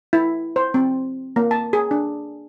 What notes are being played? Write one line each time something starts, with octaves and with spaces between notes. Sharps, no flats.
E4
C5
C4
A#3
A5
G#4
D4